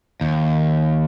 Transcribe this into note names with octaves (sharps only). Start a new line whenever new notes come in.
D#2